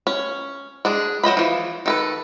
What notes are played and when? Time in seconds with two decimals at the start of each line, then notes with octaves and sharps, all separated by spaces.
0.07 C#4
0.85 G#3 D4 G#4
1.24 F#3 C5 D#5 B5
1.37 E3 F3
1.86 D#3 A4 B4